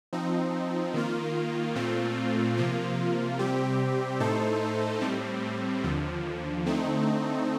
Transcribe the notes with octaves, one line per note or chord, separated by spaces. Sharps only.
F3 C4 D#4
D#3 A#3 F4
A#2 A3 C4 F4
C3 F3 A#3 F4
C3 G3 C4 G4
A2 A3 D#4 A4 C5
A2 G3 C4
D#2 D3 F3
D3 A3 C4 D#4